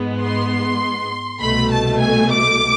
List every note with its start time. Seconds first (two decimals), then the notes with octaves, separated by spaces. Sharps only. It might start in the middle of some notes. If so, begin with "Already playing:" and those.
Already playing: G#2 G#3 B3
0.21 C6
1.41 C2 B2 A3 B5
1.71 A5
2.00 G#5
2.32 D6